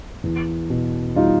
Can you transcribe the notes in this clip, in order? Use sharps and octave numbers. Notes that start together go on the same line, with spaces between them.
E2
B2
G3 D#4 F4